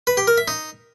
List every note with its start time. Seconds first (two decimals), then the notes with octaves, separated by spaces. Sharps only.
0.07 B4
0.17 G4
0.27 A#4
0.38 E5
0.48 D#4